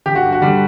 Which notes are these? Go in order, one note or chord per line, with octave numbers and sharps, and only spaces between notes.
D3 G4
F#4
G2
F#4
D3 G3